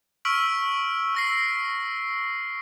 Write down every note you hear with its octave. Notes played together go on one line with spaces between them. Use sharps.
C#6 E6 F6 B6 D7 F#7
E6 A#6 C7